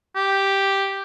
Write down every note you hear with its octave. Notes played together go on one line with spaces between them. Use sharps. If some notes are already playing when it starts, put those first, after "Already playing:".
G4